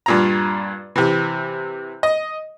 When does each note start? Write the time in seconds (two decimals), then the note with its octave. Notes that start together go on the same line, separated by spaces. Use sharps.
0.06 G2 A#2 A#5
0.96 C3 E3
2.03 D#5